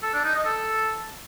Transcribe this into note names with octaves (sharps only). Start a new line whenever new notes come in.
A4
D4
D#4
D#5
A4